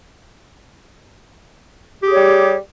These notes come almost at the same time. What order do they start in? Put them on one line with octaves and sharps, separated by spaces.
G4 G#4 C#5 G3